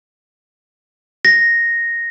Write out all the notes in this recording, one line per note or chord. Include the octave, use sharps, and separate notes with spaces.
A#6